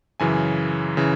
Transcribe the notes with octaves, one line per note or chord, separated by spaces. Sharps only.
F#2 C#3 E3 G#5
C#3 E3